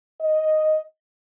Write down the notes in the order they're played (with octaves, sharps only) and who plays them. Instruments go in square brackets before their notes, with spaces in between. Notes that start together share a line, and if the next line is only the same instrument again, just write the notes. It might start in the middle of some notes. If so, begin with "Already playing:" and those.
[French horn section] D#5